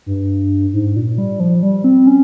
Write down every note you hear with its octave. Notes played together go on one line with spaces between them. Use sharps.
G2
G#2
A#2
G3
F3
G3
C4
C#4